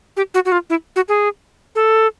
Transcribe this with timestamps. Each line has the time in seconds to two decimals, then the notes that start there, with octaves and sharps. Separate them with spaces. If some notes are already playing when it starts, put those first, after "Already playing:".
0.17 G4
0.34 F#4
0.45 F#4
0.52 F4
0.70 E4
0.96 F#4
1.09 G#4
1.75 A4